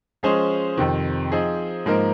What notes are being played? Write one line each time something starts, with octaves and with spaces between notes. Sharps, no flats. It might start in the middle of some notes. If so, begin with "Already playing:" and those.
F3 G#3 C#4 G#4 C5
F2 C3 D#3
F3 C4 D#4 G#4
G#2 F3 A#3 D#4 A#4